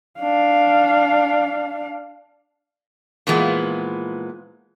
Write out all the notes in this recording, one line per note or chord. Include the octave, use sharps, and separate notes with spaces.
D4 F5
A#2 E3 F3 G#3 B3